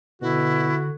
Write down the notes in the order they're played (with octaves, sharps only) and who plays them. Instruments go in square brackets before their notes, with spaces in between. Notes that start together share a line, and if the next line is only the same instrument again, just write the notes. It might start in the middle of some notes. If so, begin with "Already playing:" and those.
[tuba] B2 [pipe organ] D3 [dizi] E4 [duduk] F#4